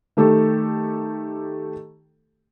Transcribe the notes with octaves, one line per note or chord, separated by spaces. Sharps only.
D#3 A3 G4 A4